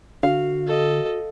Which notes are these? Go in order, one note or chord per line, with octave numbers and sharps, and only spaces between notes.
D3 F#4 F5
A4 D#5